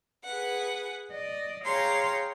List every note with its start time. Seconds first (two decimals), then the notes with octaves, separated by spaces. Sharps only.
0.25 G#4 B4 F#5
1.12 D5 D#5
1.65 G#4 C#5 F5 G5 A#5 C6